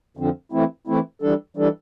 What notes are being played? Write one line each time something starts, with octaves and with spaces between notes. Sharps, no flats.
F2 D3 F3 C4
E3 A3 C4 E4
E3 A3 C4 E4
E3 G3 D4 A4
E3 G3 D4 A4